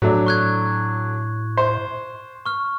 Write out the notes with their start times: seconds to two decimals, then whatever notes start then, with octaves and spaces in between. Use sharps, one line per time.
0.02 A2 F#3 A3 D4
0.26 C#6 F#6 G#6
1.57 C5
2.46 C#6 F6